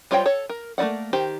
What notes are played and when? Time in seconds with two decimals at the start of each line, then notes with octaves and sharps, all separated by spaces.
0.11 G3 F4 C5 C#5 G5
0.26 A4 C#5
0.49 A#4
0.78 A3 A#3 E4 D5 F#5
1.13 D#3 G4 C5